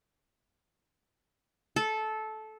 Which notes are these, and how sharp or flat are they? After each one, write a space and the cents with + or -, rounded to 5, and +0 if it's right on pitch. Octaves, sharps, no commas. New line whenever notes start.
A4 -15